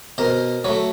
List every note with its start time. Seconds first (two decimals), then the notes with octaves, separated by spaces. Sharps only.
0.18 B2 A#4 C5
0.64 F#3 A3 B4 C#5